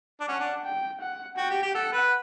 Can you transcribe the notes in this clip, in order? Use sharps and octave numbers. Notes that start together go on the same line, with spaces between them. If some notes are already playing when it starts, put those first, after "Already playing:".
D4
C#4 F#5
D4
G5
F#5
F#4 G5
G4
G4
A4 F#5
B4